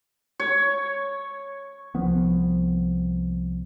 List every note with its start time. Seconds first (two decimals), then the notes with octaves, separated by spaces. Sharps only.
0.40 C#5
1.95 C2 F3 B3